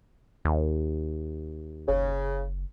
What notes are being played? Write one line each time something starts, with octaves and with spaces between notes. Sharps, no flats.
D#2
F#1 C#3